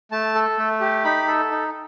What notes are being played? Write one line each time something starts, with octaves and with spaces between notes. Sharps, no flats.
A3 A5
A4
A3
G4
D#4 B5
A4
D#4